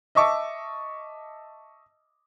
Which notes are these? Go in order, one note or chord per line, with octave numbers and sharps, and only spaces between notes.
D#5 E5 A5 C#6 D6 E6